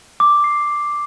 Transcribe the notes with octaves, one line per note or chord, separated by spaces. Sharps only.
D6
C7